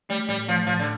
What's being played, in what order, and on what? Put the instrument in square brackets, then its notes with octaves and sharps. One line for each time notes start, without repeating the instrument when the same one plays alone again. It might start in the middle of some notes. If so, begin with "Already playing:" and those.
[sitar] G3 [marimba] A3
[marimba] A2 [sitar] G3
[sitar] F3 [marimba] A3
[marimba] A2 [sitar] F3
[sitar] D3